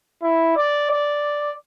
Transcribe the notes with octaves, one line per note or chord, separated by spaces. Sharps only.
E4
D5
D5